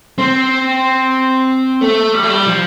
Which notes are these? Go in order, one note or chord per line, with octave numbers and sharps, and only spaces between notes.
C4
A3
G3
A3
G3
F3